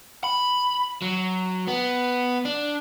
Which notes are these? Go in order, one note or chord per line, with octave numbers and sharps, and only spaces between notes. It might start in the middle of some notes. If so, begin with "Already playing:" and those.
B5
F#3
B3
D4